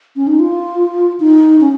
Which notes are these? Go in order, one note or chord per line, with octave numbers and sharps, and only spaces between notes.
C#4
D#4
F4
D#4
C#4